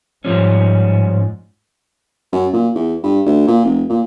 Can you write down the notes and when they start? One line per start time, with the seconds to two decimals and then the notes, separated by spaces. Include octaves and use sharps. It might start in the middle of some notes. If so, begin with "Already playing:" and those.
0.25 G#2 F3 G3 C#4
2.33 F#2
2.53 A#2
2.75 E2
3.03 G2
3.26 D2
3.47 A#2
3.64 F1
3.90 A#2